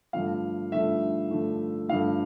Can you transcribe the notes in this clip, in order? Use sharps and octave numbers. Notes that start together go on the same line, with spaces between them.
G2 D3 F3 A3 F5
G2 D3 F3 A3 E5
G2 D3 F3 A3
G2 D3 F3 A3 F5